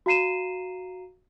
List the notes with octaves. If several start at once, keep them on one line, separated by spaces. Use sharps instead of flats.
F#4 F5 A#5 C7 D#7 E7